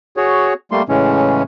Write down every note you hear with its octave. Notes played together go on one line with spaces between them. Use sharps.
F#4 G#4 C#5
G3 A3 A#3 C6
A2 C#3 E3 G#3 C#4